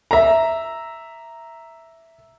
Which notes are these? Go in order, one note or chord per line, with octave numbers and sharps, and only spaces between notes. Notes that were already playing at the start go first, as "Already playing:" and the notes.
E5 A#5